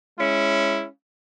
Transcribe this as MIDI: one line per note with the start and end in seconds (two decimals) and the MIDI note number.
0.18 0.87 56
0.18 0.87 61
0.18 0.87 64